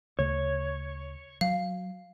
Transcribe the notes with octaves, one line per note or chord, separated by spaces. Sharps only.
D2 C#3 A3 C#5
F#3 F5